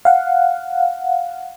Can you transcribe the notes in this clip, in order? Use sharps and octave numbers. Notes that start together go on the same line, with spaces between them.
F5 F#5